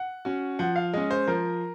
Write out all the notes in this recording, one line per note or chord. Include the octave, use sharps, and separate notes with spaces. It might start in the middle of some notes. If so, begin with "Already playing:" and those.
Already playing: F#5
C#4 F#4
F3 F#5
F5
G#3 C#4 D#5
C5
F3 A#4